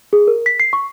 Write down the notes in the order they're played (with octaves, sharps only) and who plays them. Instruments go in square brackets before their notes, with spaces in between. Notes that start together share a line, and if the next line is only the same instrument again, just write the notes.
[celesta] G#4
A#4
B6
C7
C#6